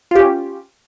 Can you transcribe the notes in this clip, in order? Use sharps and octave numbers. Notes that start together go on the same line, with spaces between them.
C#4 F4 G4